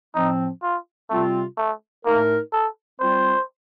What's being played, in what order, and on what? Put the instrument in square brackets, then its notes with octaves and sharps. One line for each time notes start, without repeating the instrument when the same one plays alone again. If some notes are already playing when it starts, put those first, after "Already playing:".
[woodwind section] A2 F3 C4 [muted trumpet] D#4
[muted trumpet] F4
[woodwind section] C3 G3 C4 F4 [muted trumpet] A3
[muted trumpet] A3
[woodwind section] A2 A3 D#4 A#4 [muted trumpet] A#3
[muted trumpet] A4
[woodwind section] G3 C4 F4 [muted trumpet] C5